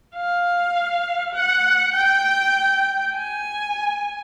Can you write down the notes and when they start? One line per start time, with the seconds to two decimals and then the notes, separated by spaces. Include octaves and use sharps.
0.15 F5
1.35 F#5
1.94 G5
3.15 G#5